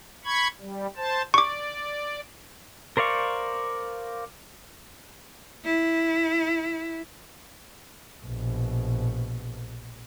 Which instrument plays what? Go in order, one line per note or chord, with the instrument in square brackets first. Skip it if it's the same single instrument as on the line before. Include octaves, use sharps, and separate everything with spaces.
[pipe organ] B5 C#6 G#6
G3
C5 A5
[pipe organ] D5 [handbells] C#6 D6
[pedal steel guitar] A#4 C5 D5 F5 C#6
[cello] E4
[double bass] A#1 B2